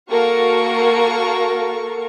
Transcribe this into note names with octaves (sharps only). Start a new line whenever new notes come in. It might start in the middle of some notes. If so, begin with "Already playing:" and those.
A#3 F#4 A4 A#4 F5 C#6